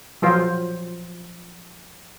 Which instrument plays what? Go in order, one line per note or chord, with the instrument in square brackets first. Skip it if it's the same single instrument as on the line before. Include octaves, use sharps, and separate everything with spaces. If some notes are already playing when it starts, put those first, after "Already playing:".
[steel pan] F3 F#3 F4 C5